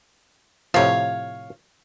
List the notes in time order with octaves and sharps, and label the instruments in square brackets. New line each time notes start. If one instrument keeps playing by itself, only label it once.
[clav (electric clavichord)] A2 C3 F3 [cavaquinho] C#5 F5